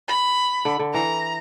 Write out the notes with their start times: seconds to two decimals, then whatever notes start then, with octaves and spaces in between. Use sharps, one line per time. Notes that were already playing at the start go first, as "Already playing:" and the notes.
0.08 B5
0.65 D3
0.79 D3
0.94 E3 A#5